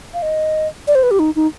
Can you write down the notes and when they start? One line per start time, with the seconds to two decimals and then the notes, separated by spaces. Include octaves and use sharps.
0.14 F5
0.22 D#5
0.87 D5
0.95 C5
1.03 B4
1.11 G4
1.19 D#4
1.36 D#4